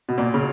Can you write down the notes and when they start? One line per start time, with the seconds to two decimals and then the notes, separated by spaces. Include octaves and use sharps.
0.09 B2
0.18 A#2
0.34 C#3